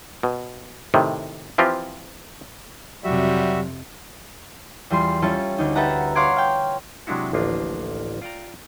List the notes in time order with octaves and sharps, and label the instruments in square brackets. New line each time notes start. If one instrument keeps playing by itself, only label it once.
[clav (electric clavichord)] B2
A2 C3 D#3
E3 F3 C4 F4 G4
[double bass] F2 C3 [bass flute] F#3 [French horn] G3 [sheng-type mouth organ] F#4 E5
[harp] E2 G3 F4 C6
G3 C#4 E4 F4 A4
D2 D#4
G4 A4 B4 E5 F#5 A#5
C#5 F5 F#5 C6 D6 G#6
F5 G5
[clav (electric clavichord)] C3 F#3 G#3 D4 E4 F#4
A1 D2 F3 A#3 D4 F4
F4 D5 G5 A#5